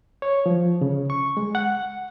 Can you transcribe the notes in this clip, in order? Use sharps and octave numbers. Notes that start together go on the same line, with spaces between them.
C#5
F3
C#3
C#6
G#3
F#5